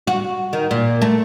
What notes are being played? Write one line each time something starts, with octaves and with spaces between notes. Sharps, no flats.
F#4
D#3
A#2
A3